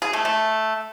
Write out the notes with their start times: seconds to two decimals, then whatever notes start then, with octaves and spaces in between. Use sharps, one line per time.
0.02 G#4
0.13 A3
0.25 A3